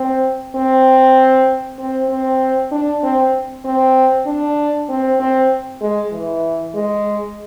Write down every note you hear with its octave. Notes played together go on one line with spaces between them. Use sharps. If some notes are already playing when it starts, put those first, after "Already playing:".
Already playing: C4
C4
C4
C4
D4
C4
C4
D4
C4
C4
G#3
E3
G#3